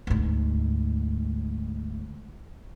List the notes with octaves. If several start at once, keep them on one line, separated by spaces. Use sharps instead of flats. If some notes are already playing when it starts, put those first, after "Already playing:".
D2 G#2